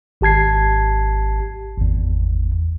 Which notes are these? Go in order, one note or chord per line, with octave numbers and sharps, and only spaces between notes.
G#1 G4 A5 G#6 C7
G#1 E2